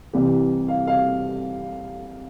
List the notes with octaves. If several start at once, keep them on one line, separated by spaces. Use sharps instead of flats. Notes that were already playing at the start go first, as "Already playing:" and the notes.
C2 C3 E3 G4
F5
F5